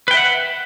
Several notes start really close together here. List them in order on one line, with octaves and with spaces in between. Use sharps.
B4 G5 E5 F#5